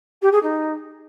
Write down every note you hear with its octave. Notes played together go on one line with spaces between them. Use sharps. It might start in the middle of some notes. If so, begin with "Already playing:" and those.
G4
G#4
D#4